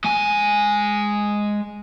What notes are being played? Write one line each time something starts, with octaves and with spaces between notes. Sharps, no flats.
G#3 G#5